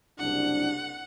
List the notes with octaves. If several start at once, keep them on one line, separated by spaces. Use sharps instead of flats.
F#1 C2 D4 F#5